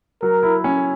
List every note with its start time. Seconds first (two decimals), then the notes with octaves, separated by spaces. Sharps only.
0.22 F#3 A#4
0.43 E4
0.64 C#4